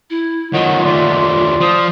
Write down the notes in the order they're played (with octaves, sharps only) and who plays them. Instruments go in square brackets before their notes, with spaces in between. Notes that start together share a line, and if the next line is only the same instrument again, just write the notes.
[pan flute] E4
[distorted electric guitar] D#3 F#3 [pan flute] F4 [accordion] C#5 D#5 F#5
[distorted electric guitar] D#2 A3 [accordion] D5 C6
[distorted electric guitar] F3 [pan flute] D#6